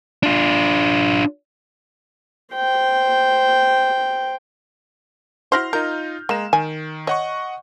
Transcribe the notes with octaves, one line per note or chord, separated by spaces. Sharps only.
D4 F4
C5 G5
E4 F#4 C5 C6 F6 A#6
D#4 F4 A#4 G6
G#3 A#3 A#5 E7
D#3 G#5
C#5 D#5 F#5 C#6